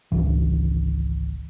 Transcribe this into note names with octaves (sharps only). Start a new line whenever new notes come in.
G#1 C#2 E3